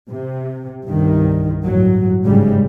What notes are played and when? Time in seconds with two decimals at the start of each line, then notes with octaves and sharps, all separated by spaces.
0.11 C3
0.86 C2 G2 D#3
1.64 G1 A2 F#3
2.24 G1 G#2 C#3 G3 G#3